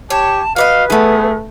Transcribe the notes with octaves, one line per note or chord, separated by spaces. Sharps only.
G4 C#5 A5
F#4 B4 D5 D#5 F5
E3 A3 B3 G#4